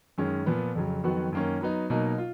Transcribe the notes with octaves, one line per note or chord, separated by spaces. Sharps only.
F#2 D#3 G#3 C#4
A#2 F3 B3
F2 C#3 F#3
F2 D#3 F#3 B3 F#4
F#2 D#3 A#3 C#4
F#3 B3 D#4
B2 F#3 A#3 D#4
F4